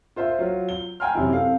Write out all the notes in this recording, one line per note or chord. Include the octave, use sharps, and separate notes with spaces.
F4 C5 E5
F#3 F4
G7
G5 G#5 A#5 C6 F6
F#2 C3 E3 E4
C4 A4 F5